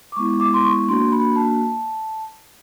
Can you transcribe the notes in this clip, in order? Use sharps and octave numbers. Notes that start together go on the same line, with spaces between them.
D6
G#3 B3 E4 C#6
D6
C6
C#6
A#3 D4 F#4 C6
B5
A5